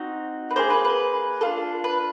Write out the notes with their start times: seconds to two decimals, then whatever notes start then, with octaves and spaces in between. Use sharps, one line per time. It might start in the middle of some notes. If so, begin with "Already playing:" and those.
Already playing: C4 D#4 F#4
0.51 B4
0.56 A#3 D#4 G#4 C5
0.70 B4
0.85 B4
1.41 D4 F4 A4
1.84 B4